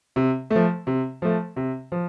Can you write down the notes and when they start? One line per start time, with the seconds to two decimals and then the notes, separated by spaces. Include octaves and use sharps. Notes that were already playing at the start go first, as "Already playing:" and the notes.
0.16 C3
0.50 F3 A3
0.87 C3
1.22 F3 A3
1.56 C3
1.92 F3